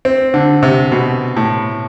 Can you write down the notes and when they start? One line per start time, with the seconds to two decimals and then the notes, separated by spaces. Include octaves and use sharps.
0.05 C4
0.34 D3
0.63 C3
0.92 B2
1.36 A2